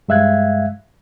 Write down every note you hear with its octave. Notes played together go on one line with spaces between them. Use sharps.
G2 G#3 E5 F5 F#6 G#6